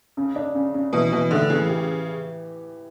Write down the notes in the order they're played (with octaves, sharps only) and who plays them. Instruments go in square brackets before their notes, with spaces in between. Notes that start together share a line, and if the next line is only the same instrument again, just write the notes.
[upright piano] C#3
D4
C#3
C#3
[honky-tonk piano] B2 [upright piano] E3
[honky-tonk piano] B2 [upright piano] E3
[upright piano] A2 [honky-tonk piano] D3
[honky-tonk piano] C#3 [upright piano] E3
[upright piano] G4